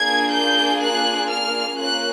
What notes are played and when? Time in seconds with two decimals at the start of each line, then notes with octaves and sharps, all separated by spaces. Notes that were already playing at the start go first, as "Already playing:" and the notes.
Already playing: A#3 D4 F4 G#4 G#6
0.32 G6
0.81 F#6
1.30 F6
1.77 A#3 C#4 F4 F#6